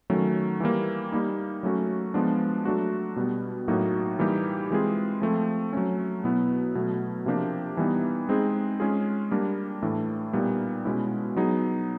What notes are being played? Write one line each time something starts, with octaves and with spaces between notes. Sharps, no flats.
D#3 F#3 A3 C#4
E3 G3 A#3
G3 A#3 D#4
F#3 A3 C#4 F#4
F3 G#3 B3 D4
F#3 A3 D4 F#4
B2 G3 B3
A2 F#3 A#3 D#4 F#4
E3 G3 A#3 D#4 G4
E3 G#3 C4 F4 G#4
F3 A3 C4
F#3 A3 C#4
B2 F#3 B3 E4
B2 F#3 A3
C3 F3 A#3 D4 G4
E3 G3 B3 D#4
G#3 C4 D#4 G#4
G#3 C#4 F4 G#4
G3 A#3 D4
A2 E3 A3 D4
A#2 G3 B3 D#4
B2 G#3 C#4 E4
F#3 B3 D#4 G#4